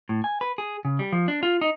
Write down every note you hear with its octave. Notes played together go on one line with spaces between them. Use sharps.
A2
G#5
B4
G#4
C#3
G3
F3
D4
F4
D#4